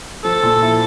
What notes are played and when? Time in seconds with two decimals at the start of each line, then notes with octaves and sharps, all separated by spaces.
0.24 F3 A4
0.43 A#2
0.62 E4